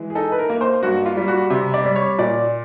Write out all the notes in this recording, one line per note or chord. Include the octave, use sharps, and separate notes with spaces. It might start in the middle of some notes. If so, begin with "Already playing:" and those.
Already playing: E3 G#3
G#4
D#4 A4
B4
A#4
A#3
C5
G2 F#4
F4
G3
F#4
C3
D5
G3
C#5
A#2 D5